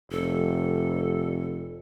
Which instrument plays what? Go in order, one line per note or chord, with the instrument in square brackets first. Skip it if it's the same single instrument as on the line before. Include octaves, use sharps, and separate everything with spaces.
[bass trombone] F1 [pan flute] A4